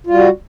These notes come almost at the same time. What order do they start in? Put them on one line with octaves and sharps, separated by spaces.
F4 G3 F#4